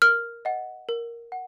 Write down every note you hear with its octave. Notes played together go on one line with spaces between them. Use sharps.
A#4 F6
D#5 F#5
A#4
F#5